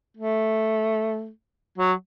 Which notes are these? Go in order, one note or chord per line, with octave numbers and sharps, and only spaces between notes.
A3
F#3